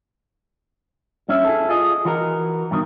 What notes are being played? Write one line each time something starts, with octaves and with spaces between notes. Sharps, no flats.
G2 C#4 E5
E4 G#4 A4
F4 G#4 D#5
E3 F#4 A#4
G2 B2 D3 D#3